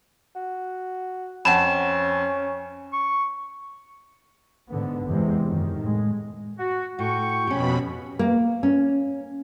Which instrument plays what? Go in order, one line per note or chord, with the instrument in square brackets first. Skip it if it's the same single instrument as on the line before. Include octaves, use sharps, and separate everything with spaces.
[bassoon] F#4
[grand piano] F2 [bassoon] C#4 [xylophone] F#5 A5 B5 [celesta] E7
[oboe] C#6
[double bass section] G#2 D3 B3
E2 C3 G#3
F#2 D#3
A2 G#3
[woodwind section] F#4
[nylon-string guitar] A2 [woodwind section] F#4 G5 C#6
[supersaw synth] F2 B2 B5 [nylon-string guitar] C#4 G4
[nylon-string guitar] A#3
C#4